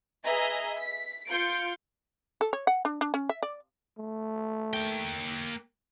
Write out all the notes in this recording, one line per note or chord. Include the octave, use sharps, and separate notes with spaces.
G#4 B4 D#5 E5 A#5
B6
F4 C6 G6 C#7 D7
A4
C#5
F#5
D4
D4
C#4
E5
D5
A3
A#3 G5